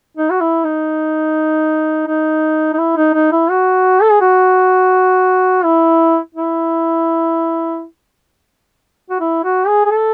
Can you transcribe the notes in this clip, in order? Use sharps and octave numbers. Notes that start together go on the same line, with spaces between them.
D#4
F#4
E4
D#4
D#4
D#4
E4
D#4
D#4
E4
F#4
A4
G#4
F#4
E4
E4
F#4
E4
F#4
G#4
G#4
A4